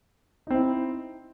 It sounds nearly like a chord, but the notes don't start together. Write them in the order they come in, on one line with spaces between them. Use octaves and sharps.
D#4 C4 E4